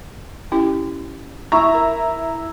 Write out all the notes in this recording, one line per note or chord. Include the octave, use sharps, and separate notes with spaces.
C#4 E4 G4
E4 E5 A#5 C#6
A#4